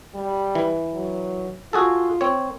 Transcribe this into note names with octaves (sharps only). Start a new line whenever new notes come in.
G3
E3
F#3
F4 F#4 G#4 A4
C4 C#5